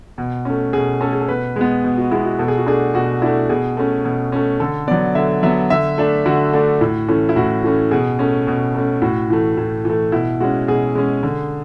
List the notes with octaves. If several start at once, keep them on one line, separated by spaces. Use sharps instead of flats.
B2
A3 C#4
B2 G#4
A3 C#4 A4
G#4
A4
B2 B4
G#3 B3
B2
F#4
G#3 B3 E4
F#4
B2 A4
G#4
F#4
A3 D4 G#4
B2 F#4
A3 D4 E4
B2 G#4
A3 C#4
B2
A3 C#4
D3 A4
F#3 B3 D5
D3 E5
F#3 B3 E5
D3 E5
A3 D4
D3 F#4
A3 D4
A2
E3 A3 C#4
E4
A2 F#4
E3 A3 C#4
B2 G#4
A3 C#4
B2
A3 C#4
A2 F#4
E3 A3
A2
E3 A3
B2 E4
G#3 C#4 F#4
B2 G#4
G#3 C#4
D3